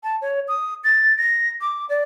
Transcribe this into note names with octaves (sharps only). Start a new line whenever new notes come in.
A5
C#5
D#6
A6
A#6
D6
D5